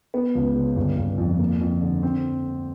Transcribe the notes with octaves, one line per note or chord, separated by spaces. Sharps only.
B3
C#2
C#3
G1
G1
F2
A#3
F2
D3
C4